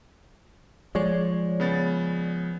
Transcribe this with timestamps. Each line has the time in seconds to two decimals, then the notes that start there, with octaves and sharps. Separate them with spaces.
0.95 F3 G#3 C#5 D5
1.60 C#3 B3 A6